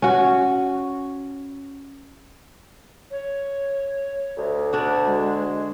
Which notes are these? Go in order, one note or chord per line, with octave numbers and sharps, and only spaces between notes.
C#4 F#4
C#5
D2
D3 D4 F#4
G#3